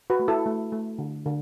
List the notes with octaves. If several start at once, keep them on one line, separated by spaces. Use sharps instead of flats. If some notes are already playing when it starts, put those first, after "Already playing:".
F#4 B4
A3
E4 A4
A3
A3
D3
D3